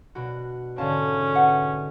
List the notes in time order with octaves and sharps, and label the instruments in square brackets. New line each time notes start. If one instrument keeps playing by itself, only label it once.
[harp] B2 D4 F#4
[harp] G#2 D3 [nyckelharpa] C#4 [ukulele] D5 F5 A5
[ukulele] B4 E5 F#5